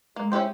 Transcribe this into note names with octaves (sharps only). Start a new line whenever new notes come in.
G#3 A#3
C#4 E4 G4 C5